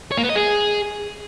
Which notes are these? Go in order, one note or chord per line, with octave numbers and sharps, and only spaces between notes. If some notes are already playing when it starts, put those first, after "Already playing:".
C#5
A#3
B3
D#5
G#4